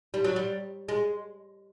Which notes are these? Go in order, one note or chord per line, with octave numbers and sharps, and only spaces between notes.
G3
F#3
G3
G#3